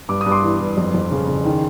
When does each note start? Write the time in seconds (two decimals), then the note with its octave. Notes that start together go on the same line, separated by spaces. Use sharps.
0.09 G2 D6
0.21 G2 D#6
0.31 C6 D6
0.43 E3
0.60 G2
0.77 F2
0.94 F2
1.11 C#3
1.28 C#3
1.45 D#3